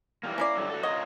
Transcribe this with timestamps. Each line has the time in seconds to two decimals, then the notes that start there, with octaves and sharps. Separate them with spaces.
0.23 E3 G3 A#3
0.38 A#3 C#4 E4 D5
0.57 G2 F#3 A4
0.69 F#4 A4
0.83 F4 A#4 C#5 D#5